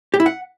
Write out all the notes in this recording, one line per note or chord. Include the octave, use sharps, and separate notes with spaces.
G4
E4
F#5